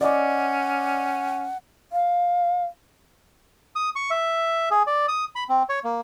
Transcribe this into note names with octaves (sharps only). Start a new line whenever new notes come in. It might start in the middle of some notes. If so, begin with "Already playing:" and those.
C#4 D5 D#5 F#5 D6
F5
D#6
C#6
E5
G#4
D5
D#6
B5
C4
C#5
A#3